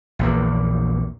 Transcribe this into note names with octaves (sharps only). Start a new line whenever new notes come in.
A#1 E2 A#3